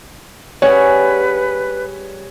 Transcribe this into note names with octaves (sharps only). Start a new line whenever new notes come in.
G3 C#4 G#4 B4 C#5 F#5